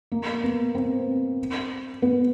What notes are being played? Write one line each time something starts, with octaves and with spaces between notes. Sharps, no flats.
A#3
B3
C4
B3